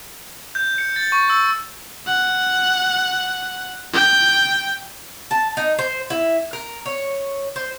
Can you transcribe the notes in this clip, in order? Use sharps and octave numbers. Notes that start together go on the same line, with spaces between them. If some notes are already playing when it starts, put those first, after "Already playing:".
G6
C#7
A6
C#6
E6
F#5
G5
A5
D#4
C5
E4
A#4
C#5
C5